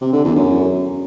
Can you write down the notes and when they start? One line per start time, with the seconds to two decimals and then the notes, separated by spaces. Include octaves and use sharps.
0.01 C3
0.13 D3
0.24 E2
0.36 F#2